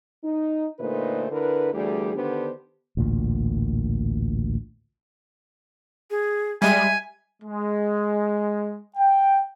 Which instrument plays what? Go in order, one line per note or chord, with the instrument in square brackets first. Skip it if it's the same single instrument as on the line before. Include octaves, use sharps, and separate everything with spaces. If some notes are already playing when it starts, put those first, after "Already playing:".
[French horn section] D#4
A#2 D3 A3 D#4 B4 C5
D3 E4 A#4 B4
D2 E3 G3 A3 G4 G#4
D3 D#3 B3 D4 G4 C5
[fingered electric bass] A1 D2 A#2
[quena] G#4
[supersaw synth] G3 G#3 D#7 [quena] E5 [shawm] G#5
[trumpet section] G#3
G5